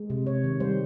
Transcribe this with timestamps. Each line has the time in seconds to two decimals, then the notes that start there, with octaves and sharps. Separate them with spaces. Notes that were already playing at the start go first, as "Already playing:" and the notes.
Already playing: G#3
0.10 C3
0.26 C3 C#5
0.44 D#3
0.60 G3 C5